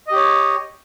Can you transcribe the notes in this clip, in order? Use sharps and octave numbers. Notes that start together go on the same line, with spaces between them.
G4 C#5 D#5